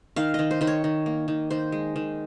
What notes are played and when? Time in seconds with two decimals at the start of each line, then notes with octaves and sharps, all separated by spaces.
0.16 D#3 F5
0.34 D#3 D#5
0.51 C5
0.61 D#3 C5
0.67 C#5
0.84 D#3
1.06 A#3
1.28 D#3
1.50 D#3 C5
1.72 G#3
1.96 D#3